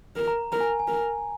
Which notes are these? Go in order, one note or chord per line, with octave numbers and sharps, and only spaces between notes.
A#4
A#5
A#4 A#5
G#5
G#5
A#4